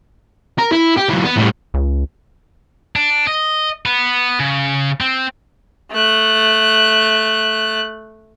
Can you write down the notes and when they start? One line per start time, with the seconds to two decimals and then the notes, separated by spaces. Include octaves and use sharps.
0.58 A#4
0.72 E4
0.97 G4
1.09 E3 F#3
1.24 B3
1.37 A2 G3
1.74 C#2
2.96 D4
3.27 D#5
3.86 B3
4.39 C#3
5.01 C4
5.91 A3 F#6